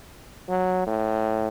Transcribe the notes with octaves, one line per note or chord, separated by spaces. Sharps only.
F#3
A2